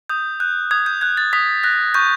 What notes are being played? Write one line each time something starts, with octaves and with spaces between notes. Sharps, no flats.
D#6 G6
F#6 G6
D#6 G#6
G6
F#6 G#6
A6
D#6 B6
F#6 A#6
C#6 G6